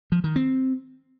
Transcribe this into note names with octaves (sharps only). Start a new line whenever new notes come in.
F3
D#3
C4